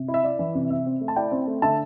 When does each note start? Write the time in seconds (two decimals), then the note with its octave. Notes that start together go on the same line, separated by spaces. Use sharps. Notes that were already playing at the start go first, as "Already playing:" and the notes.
Already playing: C3
0.08 E4
0.14 E5
0.24 E4 D5
0.39 E3
0.55 C3
0.70 C3 E5
0.86 C4
1.01 A3
1.08 A5
1.16 E4 D5 G5
1.32 C4
1.47 A3
1.62 D3 E5 A5